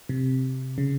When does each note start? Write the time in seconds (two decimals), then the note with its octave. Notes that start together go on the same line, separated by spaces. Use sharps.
0.09 C3
0.78 C#3